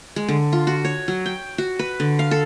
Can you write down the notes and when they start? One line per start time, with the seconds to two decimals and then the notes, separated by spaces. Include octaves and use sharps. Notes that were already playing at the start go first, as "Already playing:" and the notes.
0.16 G#3
0.29 D3
0.53 F4
0.67 F#4
0.85 C#5
1.08 F#3
1.26 G5
1.58 F#4
1.79 B4
2.00 D3
2.19 F5
2.31 A4